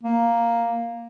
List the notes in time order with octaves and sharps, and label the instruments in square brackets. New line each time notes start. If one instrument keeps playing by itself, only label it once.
[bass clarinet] A#3